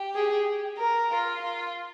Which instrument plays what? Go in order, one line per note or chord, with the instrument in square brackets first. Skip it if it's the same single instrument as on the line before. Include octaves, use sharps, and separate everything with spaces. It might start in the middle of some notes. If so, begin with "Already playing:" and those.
Already playing: [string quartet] G4
[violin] G#4
A#4
[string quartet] F4
F4